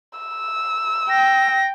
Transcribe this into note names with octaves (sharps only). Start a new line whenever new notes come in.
E6
G5 A#6